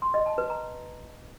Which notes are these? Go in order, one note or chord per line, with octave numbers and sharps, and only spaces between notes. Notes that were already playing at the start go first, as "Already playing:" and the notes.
C6
D#5
A5
B4
A#5